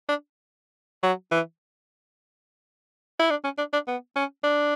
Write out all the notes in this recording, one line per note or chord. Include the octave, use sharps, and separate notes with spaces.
D4
F#3
E3
E4
D4
C#4
D4
D4
B3
C#4
D4